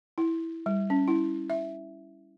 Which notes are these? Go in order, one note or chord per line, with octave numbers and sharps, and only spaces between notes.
E4
G3
C#4
E4
E5